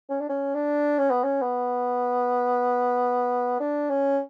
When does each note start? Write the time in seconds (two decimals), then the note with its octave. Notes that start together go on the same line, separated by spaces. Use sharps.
0.10 C#4
0.20 D4
0.29 C#4
0.55 D4
0.99 C#4
1.10 B3
1.24 C#4
1.42 B3
3.60 D4
3.90 C#4